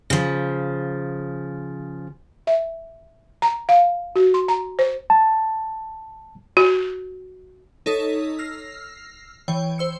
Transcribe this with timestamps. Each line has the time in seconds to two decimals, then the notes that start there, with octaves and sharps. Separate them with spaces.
0.10 C#3 F3
2.47 E5
3.42 A#5
3.69 F5
4.16 F#4
4.34 C6
4.48 A#5
4.79 C5
5.10 A5
6.57 F#4
7.86 D#4 A4 C#5 D#6 B6
8.39 E6 F6 A#6 C7
9.48 E3 C#5 G5
9.78 C5 E6 C#7